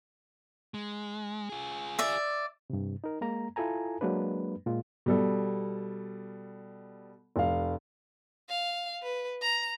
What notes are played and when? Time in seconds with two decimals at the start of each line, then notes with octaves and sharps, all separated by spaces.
0.74 G#3
1.49 F4 G#4
1.99 D5 E5
2.70 G2 C3
3.04 D#4 A#4
3.21 G#3 A#3 A#5
3.56 E4 F4 A4 G#5 A#5
4.01 F#3 G#3 A#3 D4 B4
4.66 A#2 G#3 F4
5.06 B2 G3 A4
7.36 F1 F5
8.49 F5
9.02 B4
9.42 A#5